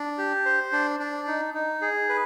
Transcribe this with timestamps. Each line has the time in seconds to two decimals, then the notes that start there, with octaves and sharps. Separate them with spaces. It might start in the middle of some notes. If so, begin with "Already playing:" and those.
Already playing: D4
0.18 G4
0.46 C5
0.72 D4
1.00 D4
1.27 D#4
1.54 D#4
1.81 G#4
2.09 B4